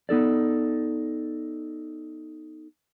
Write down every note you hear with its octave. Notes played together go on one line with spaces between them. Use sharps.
B3 D#4 A4 D5